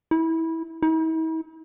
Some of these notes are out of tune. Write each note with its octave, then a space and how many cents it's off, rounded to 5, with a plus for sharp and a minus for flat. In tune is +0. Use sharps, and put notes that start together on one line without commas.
E4 -20
E4 -45